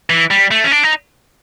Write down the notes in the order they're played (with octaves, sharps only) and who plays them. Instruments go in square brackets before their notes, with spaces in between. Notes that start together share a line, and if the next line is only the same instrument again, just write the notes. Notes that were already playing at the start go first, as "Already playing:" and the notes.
[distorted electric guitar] E3
G3
A3
C#4
D4
D#4